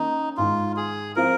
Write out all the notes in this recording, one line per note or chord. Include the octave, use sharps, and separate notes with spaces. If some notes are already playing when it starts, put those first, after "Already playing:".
Already playing: D#3 A#3 C#4 D#4
G#2 D#3 G#3 D#4 F4
G#4
F3 C4 F4 A#4